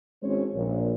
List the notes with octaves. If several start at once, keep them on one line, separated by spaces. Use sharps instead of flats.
G#1 G#3 C4 C#4 C5 C#5
A#1